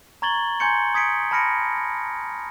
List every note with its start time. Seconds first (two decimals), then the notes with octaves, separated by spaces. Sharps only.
0.22 A#5 C#6 G#6 A6 F#7 G7
0.60 G#5 A#5 C6 G6 G#6 C#7
0.94 D#6 G#6 B6 C#7 D7
1.31 A5 B5 F6 A#6 C#7 D7